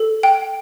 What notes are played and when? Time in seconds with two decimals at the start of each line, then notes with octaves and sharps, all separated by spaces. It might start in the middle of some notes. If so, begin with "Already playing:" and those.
Already playing: A4
0.23 G5